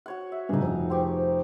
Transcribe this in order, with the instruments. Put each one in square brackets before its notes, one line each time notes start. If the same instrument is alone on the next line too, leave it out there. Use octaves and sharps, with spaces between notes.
[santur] F#4 C#5 F#5
E5
[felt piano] G2 C#3 [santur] D#4 G#4
[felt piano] F1
[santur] C4 G4 C#6